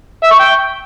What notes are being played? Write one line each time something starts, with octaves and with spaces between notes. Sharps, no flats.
E5
C#6
G5